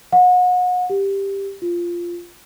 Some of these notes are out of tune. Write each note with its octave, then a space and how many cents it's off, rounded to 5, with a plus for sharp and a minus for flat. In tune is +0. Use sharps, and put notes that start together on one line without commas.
F#5 -35
G4 +5
F4 -10